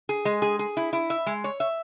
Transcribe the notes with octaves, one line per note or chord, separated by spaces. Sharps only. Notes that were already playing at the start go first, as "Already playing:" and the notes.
G#4
G#3
G#4
G#4
E4
E4
E5
G#3
C#5
E5